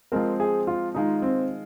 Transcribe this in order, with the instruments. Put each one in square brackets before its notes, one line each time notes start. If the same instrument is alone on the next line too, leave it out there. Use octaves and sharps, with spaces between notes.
[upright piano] F3 G#3 C4 [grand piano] A#4
[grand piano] G#4
F4
[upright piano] D#3 G#3 F4 [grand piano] D#4
[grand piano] C4